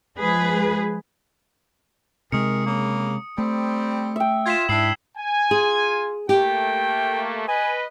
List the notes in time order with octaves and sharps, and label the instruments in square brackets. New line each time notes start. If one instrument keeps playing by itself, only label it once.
[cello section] F3 G#3 G#4 B4
[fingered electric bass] C3 G#3 [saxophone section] D#3 G#4 A#4 [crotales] D#6 C#7
[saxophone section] C#3 A#3
[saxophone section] G3 C4 [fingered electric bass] A3
[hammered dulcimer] E5 G5
[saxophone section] F4 [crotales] G#6 B6 E7
[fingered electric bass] G#2 [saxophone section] D4 E4 [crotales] E6 C7 F#7
[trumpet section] G#5
[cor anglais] F4 [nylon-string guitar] G#4
[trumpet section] A3 A#3 [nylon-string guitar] G4 [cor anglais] G5
[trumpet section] B4 D#5 [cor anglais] G#5